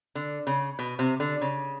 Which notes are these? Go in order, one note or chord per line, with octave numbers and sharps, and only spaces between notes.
D3
C#3
B2
C3
D3
C#3